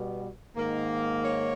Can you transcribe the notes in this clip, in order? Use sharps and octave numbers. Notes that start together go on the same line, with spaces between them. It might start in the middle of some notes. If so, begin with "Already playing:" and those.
Already playing: B2 G3 B3
G#2 D#3 A#3
C#5